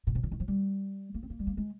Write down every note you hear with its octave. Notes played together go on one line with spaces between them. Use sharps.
A#2
C3
D3
D#3
F3
G3
A#3
C4
A#3
G3
A#3
G#3